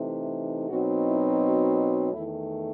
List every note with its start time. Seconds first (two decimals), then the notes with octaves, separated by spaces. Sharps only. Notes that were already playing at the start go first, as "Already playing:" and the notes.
Already playing: C3 E3 A3 D#4
0.69 B2 F#3 C4 D#4 F#4
1.05 E4
1.40 F#4
1.76 F#4
2.13 E2 D#3 A3 E4